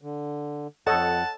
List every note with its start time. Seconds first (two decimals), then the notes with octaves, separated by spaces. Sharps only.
0.01 D3
0.87 F2 A4 C#5 D#5 F#5 A5